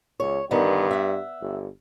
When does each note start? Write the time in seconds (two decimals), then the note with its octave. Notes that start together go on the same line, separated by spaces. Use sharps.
0.20 C#2 C#5
0.51 G2 D3 D#3 B3
0.91 E5 F#5
1.41 G1